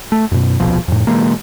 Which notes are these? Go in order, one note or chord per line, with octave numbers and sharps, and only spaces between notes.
A3
F#2 B2
D#1 C2 B2 F3
F2 A2
B2 E3 G#3 A#3